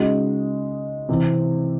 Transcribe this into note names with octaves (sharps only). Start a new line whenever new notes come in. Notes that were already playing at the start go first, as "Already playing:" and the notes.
Already playing: C#3 G#3 D#4 F#4
C3 E3 C4